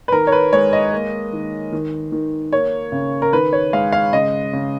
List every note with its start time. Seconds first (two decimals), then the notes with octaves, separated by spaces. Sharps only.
0.08 B4
0.12 D#3 A#4
0.27 C#5
0.32 B4
0.52 G#3 C#5
0.73 D#5
0.93 A#3
1.33 D#3
1.72 D#3
2.12 D#3
2.53 A#3 C#5
2.92 C#3
3.22 A#4
3.33 D#3 B4
3.53 C#5
3.73 G#3 F5
3.92 F5
4.13 C#3 D#5
4.53 C#3